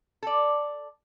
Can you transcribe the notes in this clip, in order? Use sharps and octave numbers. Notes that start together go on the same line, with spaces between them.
A4 D5